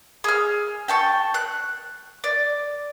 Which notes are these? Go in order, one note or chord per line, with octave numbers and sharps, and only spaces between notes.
G#4 F6
G5 A5 C#6
F#6
D5